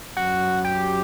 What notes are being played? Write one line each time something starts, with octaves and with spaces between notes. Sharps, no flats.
F#2 F#4
G4